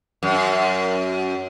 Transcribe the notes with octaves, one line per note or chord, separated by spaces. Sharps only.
F#2